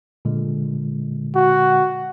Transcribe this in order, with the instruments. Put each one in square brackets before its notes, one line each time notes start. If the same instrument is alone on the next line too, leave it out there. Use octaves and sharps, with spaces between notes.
[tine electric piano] A#2 D3 G#3
[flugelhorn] F#4